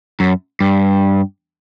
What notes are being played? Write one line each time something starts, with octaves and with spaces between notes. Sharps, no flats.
F#2
G2